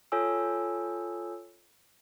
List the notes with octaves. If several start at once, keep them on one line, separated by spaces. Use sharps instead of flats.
F4 A4 C#5 G#5 E6